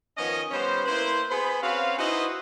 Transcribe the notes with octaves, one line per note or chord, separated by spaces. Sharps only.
D#3 F3 B3 C#4 D#5
G3 B3 C#4 C5
A#3 E4 B4 C5
B3 G#4 C5 B5
C4 C#4 F#4 B4 F5
D#4 E4 F#4 B4 C5 D#5